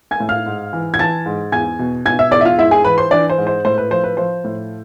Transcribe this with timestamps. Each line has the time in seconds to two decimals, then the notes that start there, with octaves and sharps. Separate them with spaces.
0.11 G#5 G#6
0.20 A2
0.29 F5 F6
0.46 G#2
0.73 E3
0.94 G#6
0.99 E3 A5 A6
1.26 G#2
1.52 E2 G#5 G#6
1.79 B2
2.05 B2 G#5 G#6
2.19 E5 E6
2.31 E2 D5 D6
2.41 E5
2.45 F4 F5
2.58 G#2 E4 E5
2.71 G#4 G#5
2.84 E3 B4 B5
2.98 C5 C6
3.11 E3 D4 D5
3.29 C5
3.38 G#2
3.47 C5
3.65 A2 C5
3.78 B4
3.91 F3 C5
4.04 B4
4.17 F3 C5
4.44 A2